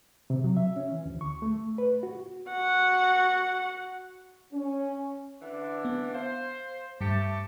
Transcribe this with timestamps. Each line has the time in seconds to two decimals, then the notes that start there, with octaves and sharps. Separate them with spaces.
0.30 C3
0.44 F#3
0.57 E5
0.76 C#4
0.92 E3
1.06 D2
1.21 C#6
1.42 A3
1.78 B4
2.03 F#4
2.50 F#4 F#5
4.53 C#4
5.42 D3 E3 D4
5.85 B3
6.14 C5 F5
7.01 G2 A3 G4 A5 C#7